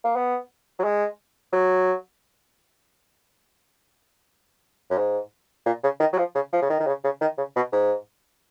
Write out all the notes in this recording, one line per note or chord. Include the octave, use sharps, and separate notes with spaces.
A#3
B3
F#3
G#3
F#3
F#2
G#2
A#2
C#3
D#3
F#3
F3
C#3
F3
C#3
D#3
D#3
C#3
C#3
D#3
C#3
B2
G#2